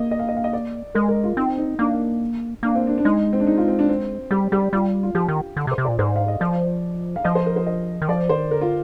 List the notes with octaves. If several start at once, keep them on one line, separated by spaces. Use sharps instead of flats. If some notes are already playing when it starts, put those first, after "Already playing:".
Already playing: A#3 D#5
D#5
F5
D#5
F5
D#5
D5
G#3 A#4
A#4
F4
C4 D#4
D#4
A#3 D4
A#3 D4
C4
D4
D4
G#3 D#4
C4
D4
D#4
F4
C4
D4
C4
G3 G4
G3 G4
G3 F4
F4
F3 G4
D#3
D3
C3
C5
C3
A#2 D5
G#2 C5
F5
D#5
F3 D5
F5
F3 D#5
C5
A#4
C5
D#5
D#3
F3 D5
D#3 C5
D3 A#4
F4